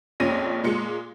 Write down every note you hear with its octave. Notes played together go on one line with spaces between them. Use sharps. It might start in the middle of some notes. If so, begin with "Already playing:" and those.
A#1 F2 A#2 C#4 A#6 D#7
A#2 G#3 C#7